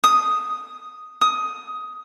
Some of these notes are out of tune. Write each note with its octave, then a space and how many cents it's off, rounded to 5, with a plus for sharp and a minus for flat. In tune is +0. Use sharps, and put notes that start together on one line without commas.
D#6 +0
D#6 +15